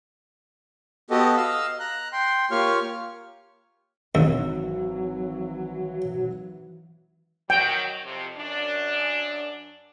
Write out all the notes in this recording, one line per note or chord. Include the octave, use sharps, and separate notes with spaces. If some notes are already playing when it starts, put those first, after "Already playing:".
B3 F#4 G4 A4 D#5
D#5 F5 E6
A#5 F#6
G5 C6
A#3 F4 G4 C#5 C#6 F6
G#1 D#2 E3 F#3 E6
D#3 F#3 G5
F2 C3
F#2 D4